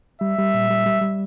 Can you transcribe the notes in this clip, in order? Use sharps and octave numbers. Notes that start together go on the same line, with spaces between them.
G3 E5
G3
A#2
G3
G3
G3